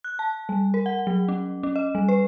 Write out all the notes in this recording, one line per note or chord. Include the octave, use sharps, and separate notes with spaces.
F#6
A5
G3
A#4
F#5
F#3
C#4
C#4
D#5
G3
B4